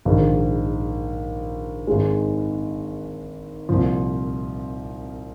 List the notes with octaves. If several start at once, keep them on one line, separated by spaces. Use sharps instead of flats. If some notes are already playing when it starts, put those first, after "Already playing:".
A#1 G#2 D#3
G#1 G#2 G#3
C2 A#2 F3